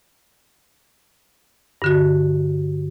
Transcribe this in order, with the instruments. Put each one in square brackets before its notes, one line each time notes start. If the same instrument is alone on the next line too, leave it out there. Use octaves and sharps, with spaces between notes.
[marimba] G2 D3 F#4